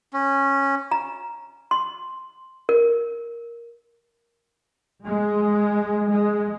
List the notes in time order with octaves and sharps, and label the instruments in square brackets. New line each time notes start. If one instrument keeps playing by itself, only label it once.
[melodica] C#4
[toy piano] A#5
C6
A#4
[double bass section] G#3
G#3